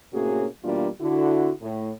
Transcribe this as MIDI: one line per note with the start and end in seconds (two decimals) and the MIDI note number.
0.13 0.46 45
0.13 0.46 48
0.13 0.46 58
0.13 0.46 61
0.13 0.46 66
0.13 0.46 68
0.63 0.88 47
0.63 0.88 52
0.63 0.88 55
0.63 0.88 58
0.63 0.88 62
0.63 0.88 65
1.01 1.51 50
1.01 1.51 64
1.01 1.51 66
1.61 1.92 45